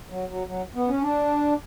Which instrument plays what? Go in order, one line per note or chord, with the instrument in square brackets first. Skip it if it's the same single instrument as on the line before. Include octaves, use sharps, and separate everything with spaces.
[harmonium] F#3
F#3
F#3
B3
C#4
D4